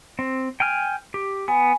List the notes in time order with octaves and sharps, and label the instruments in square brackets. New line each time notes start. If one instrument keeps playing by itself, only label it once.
[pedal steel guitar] C4
G5 G#5 F6
G4
[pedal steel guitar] B3 [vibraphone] G#5